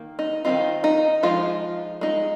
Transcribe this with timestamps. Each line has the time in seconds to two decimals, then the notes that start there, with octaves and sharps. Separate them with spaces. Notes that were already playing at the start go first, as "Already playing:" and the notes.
Already playing: D#3 A#3
0.19 D#4
0.45 D#3 G3 C4 D#4 F4
0.84 D#4
1.23 F3 G#3 D#4 F4
2.01 G#3 D#4